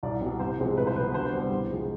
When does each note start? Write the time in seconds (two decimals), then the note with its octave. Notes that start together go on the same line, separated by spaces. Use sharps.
0.03 C2 D5
0.21 B2 G3 C4
0.39 C2 C5
0.58 C3 F3 G#3 C4
0.77 C2 B4
0.87 C5
0.96 C3 F3 B3 B4
1.14 D2 C5
1.33 C3 G3 B3
1.51 C2
1.70 C3 F3 G#3